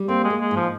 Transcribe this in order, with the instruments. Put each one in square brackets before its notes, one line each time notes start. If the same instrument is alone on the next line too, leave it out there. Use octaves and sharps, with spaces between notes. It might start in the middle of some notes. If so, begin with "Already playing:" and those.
Already playing: [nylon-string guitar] G3
[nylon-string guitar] A#3 [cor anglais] C4
[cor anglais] G#3
[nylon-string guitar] A#3
[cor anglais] G#3
[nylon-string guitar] G#2
[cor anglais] F3